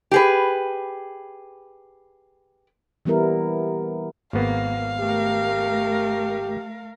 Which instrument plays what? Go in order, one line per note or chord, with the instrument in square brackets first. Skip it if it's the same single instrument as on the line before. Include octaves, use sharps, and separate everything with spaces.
[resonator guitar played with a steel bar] G4 G#4 B4
[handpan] E3 G3 B3 E4 A#4
[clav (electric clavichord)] G#1 B3 [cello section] A#3 [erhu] F5
[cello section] A3 A#4 [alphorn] G4